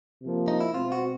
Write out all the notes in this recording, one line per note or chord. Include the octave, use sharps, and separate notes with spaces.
C3 F3 A#3
D#4
E4
B2 G#3 C4 F4
F#4